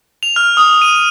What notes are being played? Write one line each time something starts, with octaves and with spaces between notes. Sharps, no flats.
F7
F6
D#6
D#7